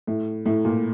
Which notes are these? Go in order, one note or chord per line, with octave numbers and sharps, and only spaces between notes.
A2
A2
A#2